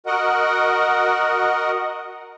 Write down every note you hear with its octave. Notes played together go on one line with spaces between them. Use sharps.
F#4 A#4 D#5 F#5